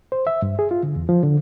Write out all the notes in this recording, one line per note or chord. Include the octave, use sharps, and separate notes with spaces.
C5
E5
G2
G#4
F4
D3
E2
F3
D3